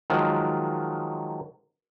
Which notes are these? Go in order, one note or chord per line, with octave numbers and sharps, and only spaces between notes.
D#3 F3 F#3 G#3